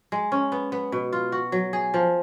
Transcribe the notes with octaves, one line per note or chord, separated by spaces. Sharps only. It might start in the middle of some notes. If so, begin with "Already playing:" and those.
G#3
C#4
B3
B3
B2
F4
F#4
F#3
G#4
F3